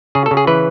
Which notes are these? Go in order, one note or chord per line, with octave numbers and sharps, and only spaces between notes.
C#3 G#4
A4
C#3
G#4
E3 B4